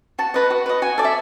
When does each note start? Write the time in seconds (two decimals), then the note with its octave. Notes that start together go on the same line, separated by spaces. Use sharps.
0.19 F#4 A5
0.34 B4 D#5
0.51 F#4
0.66 B4 D#5
0.82 F#4 G#5
0.98 A4 D5
1.04 E5